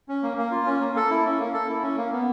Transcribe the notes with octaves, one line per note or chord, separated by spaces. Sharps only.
C#4
A#3
A#3
F4
C#4
A#3
A4
E4
C#4
A#3
A4
E4
C#4
A#3
B3